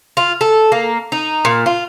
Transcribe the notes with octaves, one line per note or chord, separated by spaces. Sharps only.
F4
A4
A#3
D#4
A#2
F4